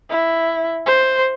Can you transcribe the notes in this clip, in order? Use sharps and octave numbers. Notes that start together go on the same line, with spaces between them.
E4
C5